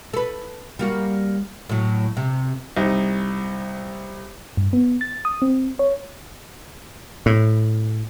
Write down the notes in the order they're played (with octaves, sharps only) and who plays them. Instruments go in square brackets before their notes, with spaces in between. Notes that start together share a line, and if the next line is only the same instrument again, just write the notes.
[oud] A4 B4
G3 A#3 F#4
A2 F#3
C3
[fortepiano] C2 D#4
[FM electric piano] G2
B3
A6
D#6
C4
C#5
[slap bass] A2